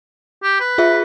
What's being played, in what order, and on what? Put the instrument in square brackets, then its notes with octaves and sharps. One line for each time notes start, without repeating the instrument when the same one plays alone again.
[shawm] G4
B4
[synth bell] F4 G#4 E5